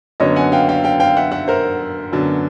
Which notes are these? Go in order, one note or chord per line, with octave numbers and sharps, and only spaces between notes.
F#2 D3 F#3 B3 C#5 D#5
F#5 G#5
F5 G5
F5 G5
F5 G5
F5 G5
E5 F#5
E5 F#5
A#4 C5
F#2 D3 F#3 B3 D4